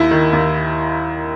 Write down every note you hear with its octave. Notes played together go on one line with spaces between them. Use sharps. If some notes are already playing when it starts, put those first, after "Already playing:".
Already playing: D#2 E4
D#3
D#2